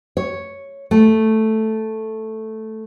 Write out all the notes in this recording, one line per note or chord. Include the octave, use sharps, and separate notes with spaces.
C#5
A3